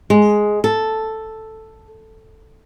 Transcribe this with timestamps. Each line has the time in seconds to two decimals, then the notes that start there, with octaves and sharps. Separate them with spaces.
0.10 G#3
0.64 A4